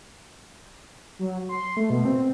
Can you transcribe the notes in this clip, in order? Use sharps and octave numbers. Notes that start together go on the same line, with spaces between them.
F#3
C6
A3
B2
C4